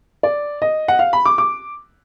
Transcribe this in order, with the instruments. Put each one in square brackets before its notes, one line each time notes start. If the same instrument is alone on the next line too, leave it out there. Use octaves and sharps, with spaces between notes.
[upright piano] D5
D#5
F#5
F5
B5
D6
D6